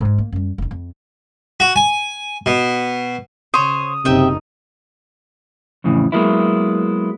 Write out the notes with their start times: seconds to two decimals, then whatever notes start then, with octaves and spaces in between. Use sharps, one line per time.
0.01 G#2 D#4
0.18 A#3
0.32 F#2 G3
0.58 F1 D#4
0.71 F2
1.60 F#4
1.76 G#5
2.46 B2
3.54 C#3 C5 C#5 D#6
4.05 F#1 C3 D#4 D#5 E5 G5
5.84 F2 A2 C#3 E3
6.12 F#3 G#3 A#3 B3 E4